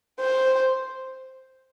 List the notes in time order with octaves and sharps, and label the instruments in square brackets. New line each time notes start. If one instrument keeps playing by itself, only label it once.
[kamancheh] C5